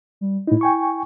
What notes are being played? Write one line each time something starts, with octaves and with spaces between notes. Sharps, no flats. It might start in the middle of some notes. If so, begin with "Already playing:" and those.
G3
A2 D#4 E4
G5 G#5 C#6